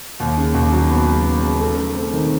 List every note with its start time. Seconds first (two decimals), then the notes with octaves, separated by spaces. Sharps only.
0.20 D#2
0.37 C#3
0.54 D#2
0.72 F#3
0.90 B3
1.07 C#3
1.25 B3
1.42 C#3
1.60 A3
1.78 A3
1.95 C4
2.13 D#3